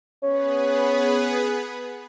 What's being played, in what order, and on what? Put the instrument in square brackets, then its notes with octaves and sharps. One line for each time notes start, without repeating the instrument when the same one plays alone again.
[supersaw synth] B3 G#4 B4 [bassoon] C#4